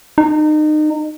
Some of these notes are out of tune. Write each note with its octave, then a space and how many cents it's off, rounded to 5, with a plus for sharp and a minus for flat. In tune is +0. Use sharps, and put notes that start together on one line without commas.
D#4 -30